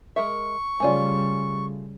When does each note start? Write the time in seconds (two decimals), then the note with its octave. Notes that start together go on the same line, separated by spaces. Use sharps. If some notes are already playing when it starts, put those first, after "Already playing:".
0.16 G#3 A#4 E5 C#6
0.80 C#3 G3 A3 C#4 F4 D5 G#5